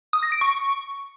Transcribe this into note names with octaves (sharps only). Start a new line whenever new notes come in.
D#6
A#6
D7
C#6